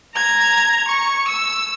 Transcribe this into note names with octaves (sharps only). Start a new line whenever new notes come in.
A#5 G#6
C#6
E6